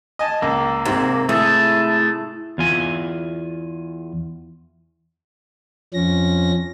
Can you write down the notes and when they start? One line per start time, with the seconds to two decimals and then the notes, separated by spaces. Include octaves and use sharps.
0.19 D#5 G#5 A5
0.42 C#2 A#3
0.85 E2 G#2 C3
1.29 A3 E4 G#4 A4
2.58 E2 F4 G#5
5.94 F2 F3 C#4 A#6